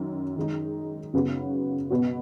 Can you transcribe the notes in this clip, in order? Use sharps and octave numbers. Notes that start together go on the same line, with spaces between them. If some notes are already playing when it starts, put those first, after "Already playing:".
Already playing: F#2 D#3
D#3 G#3 D#4
F#2 C#3 B3 F#4
B2 B3 F#4